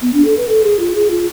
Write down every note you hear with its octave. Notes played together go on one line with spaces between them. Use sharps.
B3
D4
A4
B4
A4
G#4
F4
G#4
F4